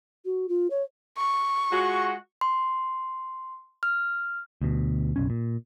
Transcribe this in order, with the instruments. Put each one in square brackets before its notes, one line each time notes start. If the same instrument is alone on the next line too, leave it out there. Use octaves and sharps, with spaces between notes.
[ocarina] F#4
F4
C#5
[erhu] C#6
[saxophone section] G#3 F4 F#4
[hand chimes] C6
F6
[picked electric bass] D2 B2
F#1 B1 C#4
A#2